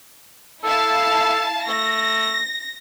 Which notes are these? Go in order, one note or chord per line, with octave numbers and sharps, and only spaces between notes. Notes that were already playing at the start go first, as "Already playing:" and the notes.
E4 A4 F5 A5
A3 A#6